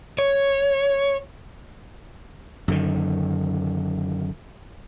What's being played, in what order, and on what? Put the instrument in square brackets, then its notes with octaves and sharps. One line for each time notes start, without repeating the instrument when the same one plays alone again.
[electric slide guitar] C#5
[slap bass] F#2 D3 D#3